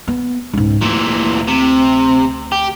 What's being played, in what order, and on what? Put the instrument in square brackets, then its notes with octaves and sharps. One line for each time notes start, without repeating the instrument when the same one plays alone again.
[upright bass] B3
C#2 G#2
[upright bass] D2 [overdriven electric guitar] A#2 E3
[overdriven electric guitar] C3
G4